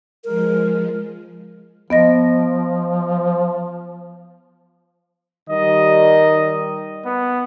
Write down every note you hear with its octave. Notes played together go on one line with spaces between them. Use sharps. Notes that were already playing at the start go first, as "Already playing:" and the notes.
F3 G#3 A#4
F3 B3 D#5 A#6
D#3 G3 D#5
B3